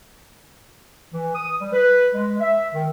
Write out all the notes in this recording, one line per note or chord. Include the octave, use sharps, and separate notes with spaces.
E3
D#6
G3
B4
G#3
E5
D#3